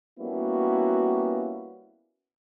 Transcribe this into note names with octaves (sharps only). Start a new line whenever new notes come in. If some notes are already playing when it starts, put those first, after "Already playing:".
G3 A#3 B3 C#4 E4 F#4